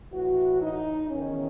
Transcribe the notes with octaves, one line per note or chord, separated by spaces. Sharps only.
A2 E3 F#4
D#4
E2 D#3 C#4